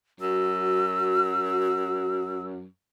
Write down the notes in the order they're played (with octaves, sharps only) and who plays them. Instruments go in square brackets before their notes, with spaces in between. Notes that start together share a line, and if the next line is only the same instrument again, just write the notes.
[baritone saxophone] F#2 [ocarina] F#4 [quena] E6